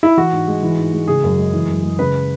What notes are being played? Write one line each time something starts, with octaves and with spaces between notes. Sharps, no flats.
E4
E3 F#4
G#2
G#3
E3
G#2
G#3
C#3 G#4
F#2
G#3
E3
F#2
G#3
C#3 B4